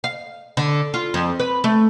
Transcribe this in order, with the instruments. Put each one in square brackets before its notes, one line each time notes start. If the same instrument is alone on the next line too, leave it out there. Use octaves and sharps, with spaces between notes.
[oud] F5
D3
F4
F2
B4
A3